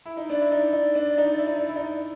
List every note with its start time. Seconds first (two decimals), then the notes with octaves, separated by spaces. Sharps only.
0.06 E4
0.17 D#4
0.30 D4 D5
0.41 E4
0.52 D#4
0.73 D#4
0.95 D4
1.18 D#4
1.39 E4
1.47 D#4
1.69 E4
1.76 D#4